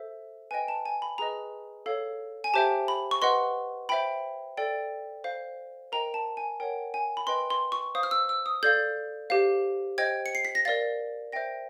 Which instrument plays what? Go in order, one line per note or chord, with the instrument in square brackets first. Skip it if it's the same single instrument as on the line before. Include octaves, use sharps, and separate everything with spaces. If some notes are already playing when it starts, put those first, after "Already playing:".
Already playing: [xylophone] A4 C5 E5
B4 D#5 G5 G#5
A5
G#5
B5
G#4 B4 D#5 A#5
A4 C#5 F5
G#5
G4 C5 E5 G5 A5
B5
C#6
B4 D#5 F#5 C6
C5 E5 G5 B5
A4 D5 G5
C5 F5
A#4 D#5 G5 A#5
A5
G#5
A#4 C#5 F#5 G5
G#5
B5
B4 D#5 G5 C6
C6
C#6
C5 F5 D#6
F6
E6
E6
D#6
A4 D5 F5 G6
G4 C5 F5
C5 D#5 G5 G#6
C#7
C7
B6
A#6
A#4 D5 F5 A6
C5 E5 G5 A#6